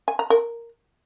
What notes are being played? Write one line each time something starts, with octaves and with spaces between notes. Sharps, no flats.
G#5
A#5
A#4